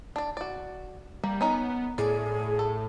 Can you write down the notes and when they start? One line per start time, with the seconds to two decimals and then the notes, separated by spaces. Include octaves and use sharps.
0.16 D4 D5
0.37 F#4 D5
1.24 G3 A#3
1.41 B3 C#4 D#4 A#4
1.98 A2 G#4 D5
2.59 A4